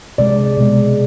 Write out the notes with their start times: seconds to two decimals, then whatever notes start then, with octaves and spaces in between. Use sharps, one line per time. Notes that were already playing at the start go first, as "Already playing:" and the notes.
0.18 C3 G#3 D5
0.57 B2 G#3